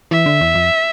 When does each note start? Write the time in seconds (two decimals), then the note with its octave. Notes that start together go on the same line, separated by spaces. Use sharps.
0.11 E3 E5
0.26 D3
0.41 E2
0.55 F2